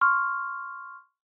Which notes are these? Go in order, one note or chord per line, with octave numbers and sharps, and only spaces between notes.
C6 C#6 F6